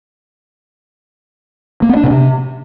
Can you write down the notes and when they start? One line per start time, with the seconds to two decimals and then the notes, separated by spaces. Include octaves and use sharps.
1.82 A#3
1.89 B3
1.96 D4
2.04 B2
2.11 C3